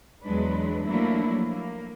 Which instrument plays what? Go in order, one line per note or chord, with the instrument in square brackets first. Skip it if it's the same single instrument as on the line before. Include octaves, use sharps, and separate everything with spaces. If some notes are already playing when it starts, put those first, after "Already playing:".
[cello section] E2 F#3 G#3 D4 B4
F3 F#3 A3 A#3 D4 E4
A#3